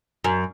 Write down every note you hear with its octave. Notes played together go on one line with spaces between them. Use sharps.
F#2